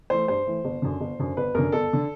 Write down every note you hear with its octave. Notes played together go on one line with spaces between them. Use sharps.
E3 A3 C5
G2 C5
E3 A3
G1
F#2 D3
G1
F#2 D3
G1 B4
F#2 D3 A#4
G1 A4
D3